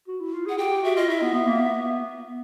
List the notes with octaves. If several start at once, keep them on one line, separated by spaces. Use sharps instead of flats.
F#4
E4
F4
G#4 F#5
G4 G5
G4
F#4 E5
F4 D#5
E4 E5
B3
B3
A#3
B3